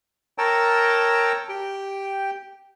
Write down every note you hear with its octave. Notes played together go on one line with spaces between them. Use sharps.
A#4 C#5 G5 A5 A#5 E6
G4 G5